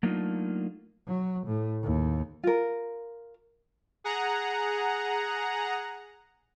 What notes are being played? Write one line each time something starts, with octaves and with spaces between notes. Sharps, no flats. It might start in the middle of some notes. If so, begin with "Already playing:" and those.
F#3 A3 A#3 D4 D#4 F4
F#3
A2
D#2
F4 A#4
G#4 F#5 A#5